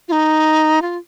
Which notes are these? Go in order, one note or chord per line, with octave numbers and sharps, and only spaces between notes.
F4
D#4
F4